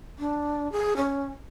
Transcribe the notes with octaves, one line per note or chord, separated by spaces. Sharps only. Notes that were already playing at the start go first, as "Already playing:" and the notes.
D4
G#4
C#4